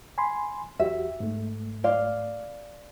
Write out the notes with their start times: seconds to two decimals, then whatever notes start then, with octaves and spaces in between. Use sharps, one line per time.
0.18 G#5 B5 C6
0.79 E2 F#4 G4 E5
1.20 G#2 A3
1.84 C5 D5 F5